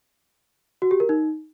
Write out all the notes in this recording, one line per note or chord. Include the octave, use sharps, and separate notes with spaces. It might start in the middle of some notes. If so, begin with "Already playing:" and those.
F#4
G4
A#4
D#4